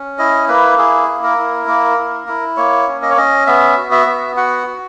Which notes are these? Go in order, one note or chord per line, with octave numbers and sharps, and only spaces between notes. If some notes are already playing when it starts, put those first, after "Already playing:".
Already playing: C#4
E4 D#5
A#3 B4
E4 G#4
A#3
A#4
E4
A#3
E4
E4
A#3 C#5
C#4
D#5
C#5
C#4 D#5
B3 E5
F#4
E5
B3
F#4 F#5
F#4